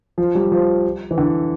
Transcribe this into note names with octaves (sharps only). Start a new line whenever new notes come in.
F3
G3
F3
E3
D3